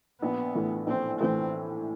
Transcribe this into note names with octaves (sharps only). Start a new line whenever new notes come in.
A#1 B3
A2 E3
A#1 C4
A2 E3 C4